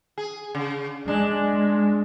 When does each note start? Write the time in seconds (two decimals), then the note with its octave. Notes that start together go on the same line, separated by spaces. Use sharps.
0.18 G#4
0.55 C#3
1.08 G#3 D4